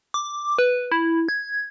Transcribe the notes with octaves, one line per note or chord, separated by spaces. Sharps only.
D6
B4
E4
G#6